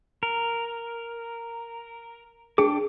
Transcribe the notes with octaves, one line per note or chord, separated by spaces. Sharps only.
A#4
D4 G#4 G5 D6